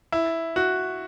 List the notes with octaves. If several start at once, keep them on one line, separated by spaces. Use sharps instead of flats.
E4
F#4